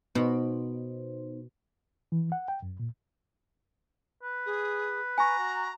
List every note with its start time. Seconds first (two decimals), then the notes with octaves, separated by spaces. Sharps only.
0.15 B2 B3 D#4 C5
2.12 E3
2.32 F#5
2.48 G5
2.62 F#2
2.80 A#2
4.23 B4
4.46 G#4
5.18 G#5 A#5 C#6
5.39 F#4